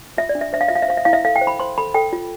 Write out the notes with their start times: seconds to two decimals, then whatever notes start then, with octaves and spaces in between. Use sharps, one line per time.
0.18 F4 E5
0.29 D5
0.35 D4
0.41 E5
0.53 C5 E5
0.61 F5
0.68 F4 E5
0.75 F5
0.82 E5
0.88 C5 F5
0.97 E5
1.05 E4 F5
1.13 E5
1.25 A4 F5
1.36 G5
1.41 C5
1.47 B5
1.60 C5 C6
1.78 A4 B5
1.94 A4 G5
2.13 F4